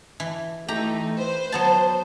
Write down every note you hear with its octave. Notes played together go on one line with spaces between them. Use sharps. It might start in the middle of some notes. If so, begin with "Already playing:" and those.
E3
E3 A3 D#4 G4 A#5
B4 C5
F#3 B3 A5